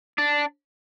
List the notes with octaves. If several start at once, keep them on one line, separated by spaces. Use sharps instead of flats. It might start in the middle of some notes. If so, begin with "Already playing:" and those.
D4